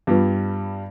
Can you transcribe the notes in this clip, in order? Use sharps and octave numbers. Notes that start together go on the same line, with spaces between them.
G2 G3 B3 F4 B4